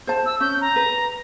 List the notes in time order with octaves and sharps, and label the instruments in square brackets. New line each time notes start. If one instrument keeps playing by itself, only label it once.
[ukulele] C5 A5
[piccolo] E6
[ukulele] C#4 [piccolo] G6
[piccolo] A#5
[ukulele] B4